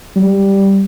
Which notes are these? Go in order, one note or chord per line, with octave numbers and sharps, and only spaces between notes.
G3